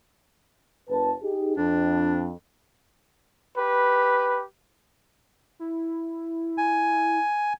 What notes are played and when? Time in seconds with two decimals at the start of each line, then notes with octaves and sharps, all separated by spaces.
0.89 F#1 B4 A5
1.22 D#4 G4 G#4
1.57 F2 D4
3.56 G4 B4
5.59 E4
6.58 G#5